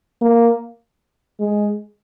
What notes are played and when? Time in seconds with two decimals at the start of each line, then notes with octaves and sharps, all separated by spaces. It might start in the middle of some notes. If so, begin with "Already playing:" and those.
0.22 A#3
1.40 G#3